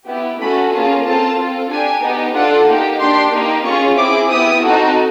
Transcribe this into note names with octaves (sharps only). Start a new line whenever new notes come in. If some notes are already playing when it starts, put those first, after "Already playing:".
B3 E4 G4
A3 C#4 F#4 A4 B5
A#3 C#4 F4 G#4 A5
C4 F4 A4 A5
C4 F4 A4
D4 G4 G#5
B3 D#4 G4
D4 F4 A4 F#5
A#3 D#4 G4
D4 G4 C6
A#3 D#4 G4
C#4 F4 G#4 C#6
C4 E4 G#4 D6
B3 E4 G4 D#6
C4 D#4 F#4 A4